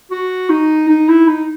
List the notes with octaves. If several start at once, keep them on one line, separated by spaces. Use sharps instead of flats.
F#4
D#4
D#4
E4
D#4